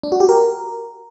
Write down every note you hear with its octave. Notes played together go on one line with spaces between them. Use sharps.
D4
F#4
G4
A#4